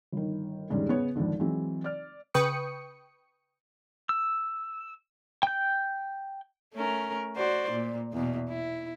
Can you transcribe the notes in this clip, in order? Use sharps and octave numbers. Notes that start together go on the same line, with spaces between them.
G1 D#3
E2 G#2 D3 G3 C#4
C#3 B3 C#5
G#1 F2 D3 F3
E3 F#3 G#3 C4
D5 F6
C#3 B4 G5 C#6 D#6 C#7
E6
G5 G6
A3 C#4 A#4
F#4 C5 D5
A#2
E2 B2
E4